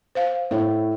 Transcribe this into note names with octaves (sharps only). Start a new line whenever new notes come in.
C5 F5
A2 C#5